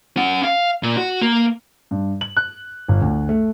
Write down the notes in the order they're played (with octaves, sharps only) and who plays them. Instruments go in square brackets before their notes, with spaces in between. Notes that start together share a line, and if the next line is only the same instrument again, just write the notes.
[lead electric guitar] C#4 F#5
F5
A#2
F#4
A#3
[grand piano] G2
F#7
F#6
G1
D2
A3